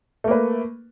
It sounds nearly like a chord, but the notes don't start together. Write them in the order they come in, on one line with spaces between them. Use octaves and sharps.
A3 A#3 B4